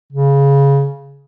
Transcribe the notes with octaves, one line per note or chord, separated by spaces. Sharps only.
C#3